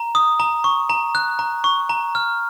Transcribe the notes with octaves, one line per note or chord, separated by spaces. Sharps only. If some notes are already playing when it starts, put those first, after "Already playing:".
Already playing: A#5
D#6
A#5
C#6
A#5
F#6
A#5
C#6
A#5
F6